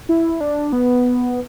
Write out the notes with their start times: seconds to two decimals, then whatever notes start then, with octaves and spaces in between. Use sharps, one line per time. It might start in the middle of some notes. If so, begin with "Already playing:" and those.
0.09 E4
0.41 D4
0.73 B3